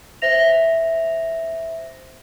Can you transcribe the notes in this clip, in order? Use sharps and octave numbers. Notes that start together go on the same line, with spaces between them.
C5 E5 A#6 F7